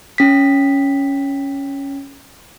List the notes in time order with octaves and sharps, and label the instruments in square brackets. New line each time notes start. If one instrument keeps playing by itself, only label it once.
[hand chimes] C#4 B6